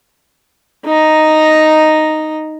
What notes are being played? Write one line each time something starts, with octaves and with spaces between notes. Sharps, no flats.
D#4 A#5